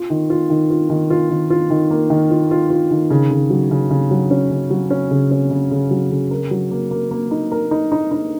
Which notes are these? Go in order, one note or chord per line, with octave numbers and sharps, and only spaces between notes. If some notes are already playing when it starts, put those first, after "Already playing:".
Already playing: F4
D#3
F4
D#3
F4
D#3
F4
D#3
F4
D#3
A#3
D#3
F4
F4
F4
D#3
C#3
C#3
F#3
C#3
C#3
F#3
C#4
C#3
F#3
C#4
C#3
C#4
C#3
C#3
F#3
C#3
A#4
F#3
A#3
A#3
A#3
D#4
A#4
D#4
D#4
D#4